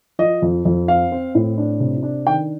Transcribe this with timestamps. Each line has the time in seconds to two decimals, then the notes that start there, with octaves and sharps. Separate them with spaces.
0.19 F3 D#5
0.42 F2
0.65 F2
0.88 C4 F5
1.12 C4
1.35 A2
1.58 D4
1.80 C3
2.03 D4
2.26 D#3 G5